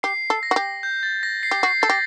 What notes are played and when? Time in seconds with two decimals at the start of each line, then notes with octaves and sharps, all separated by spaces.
0.03 G4 C7
0.30 A4
0.43 A#6
0.51 F#4
0.56 G4
0.83 G6
1.03 A6
1.23 A#6
1.43 C7
1.51 G4
1.63 F#4 C7
1.82 A4 A6
1.90 G4 A#6